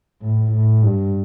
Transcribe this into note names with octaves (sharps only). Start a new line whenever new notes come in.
A2
A2
G2